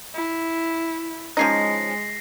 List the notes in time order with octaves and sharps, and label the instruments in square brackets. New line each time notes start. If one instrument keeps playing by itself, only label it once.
[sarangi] E4
[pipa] F3 C#4 D#4 [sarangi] G#3 [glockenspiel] A#6 C7